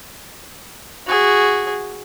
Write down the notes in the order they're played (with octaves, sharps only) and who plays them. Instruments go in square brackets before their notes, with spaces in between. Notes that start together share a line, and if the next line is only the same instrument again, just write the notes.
[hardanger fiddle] F#4 G#4